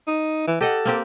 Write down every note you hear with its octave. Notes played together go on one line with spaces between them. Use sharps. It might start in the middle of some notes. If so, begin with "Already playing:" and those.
D#4
E3
G4 A4 D#5 F#5
A#3 C4 G4